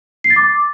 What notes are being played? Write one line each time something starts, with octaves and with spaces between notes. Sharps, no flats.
C7
A6
D6